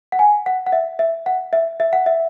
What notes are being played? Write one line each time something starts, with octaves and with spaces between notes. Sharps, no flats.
F#5
G#5
F#5
F#5
E5
E5
F#5
E5
E5
F#5
E5